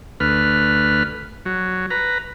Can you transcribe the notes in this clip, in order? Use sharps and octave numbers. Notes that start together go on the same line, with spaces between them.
D2 B4 F6
F#3
B4 A#5